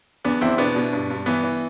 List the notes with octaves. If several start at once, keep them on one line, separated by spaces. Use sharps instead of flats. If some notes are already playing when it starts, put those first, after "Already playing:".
E2 B3 D4
E2 C4 E4
B2 B3 D4
B2
G2
G2
E3 B3
E3